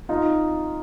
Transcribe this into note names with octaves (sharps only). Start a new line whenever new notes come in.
D#4 F4